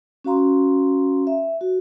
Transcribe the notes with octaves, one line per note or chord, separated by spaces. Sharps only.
C#4 F#4 F5 A#5 C6
E5
F#4